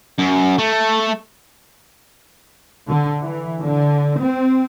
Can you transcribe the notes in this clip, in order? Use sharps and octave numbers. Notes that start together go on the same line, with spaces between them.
F#2
A3
D3
E3
D3
C4